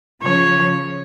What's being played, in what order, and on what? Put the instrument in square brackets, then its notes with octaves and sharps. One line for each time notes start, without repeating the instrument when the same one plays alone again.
[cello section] C#3 F3 [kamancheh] C#5